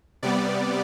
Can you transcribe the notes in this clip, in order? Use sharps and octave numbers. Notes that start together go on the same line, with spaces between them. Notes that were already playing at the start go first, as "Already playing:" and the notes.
C3 G3 B3 D5